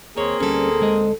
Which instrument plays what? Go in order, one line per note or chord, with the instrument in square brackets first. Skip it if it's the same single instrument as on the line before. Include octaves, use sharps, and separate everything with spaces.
[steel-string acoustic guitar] D#2 [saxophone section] A#3 C4 G#4 [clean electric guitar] C#5
[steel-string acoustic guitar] D2 A4 [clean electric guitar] G3 C#4
[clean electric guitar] G#3 D#5